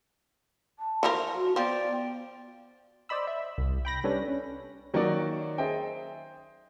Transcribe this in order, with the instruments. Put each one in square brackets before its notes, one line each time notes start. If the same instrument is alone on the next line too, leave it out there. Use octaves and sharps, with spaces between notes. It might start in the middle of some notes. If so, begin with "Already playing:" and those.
[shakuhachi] A5
[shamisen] E3 F3 A#4
[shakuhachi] F#4
[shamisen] F3 [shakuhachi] B3 [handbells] D5 G5
[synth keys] C5 D5 D#5 B5 E6
E5
C2
G5 B5 A#6
G3 C#4 D4 A4 B4 C#5
C#4
[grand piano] D#3 F#3 A#3 D#4 F#4 D5
G#4 C5 D#5 E5 G5